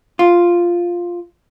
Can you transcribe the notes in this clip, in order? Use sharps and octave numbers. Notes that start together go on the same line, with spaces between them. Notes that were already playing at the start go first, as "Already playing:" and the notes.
F4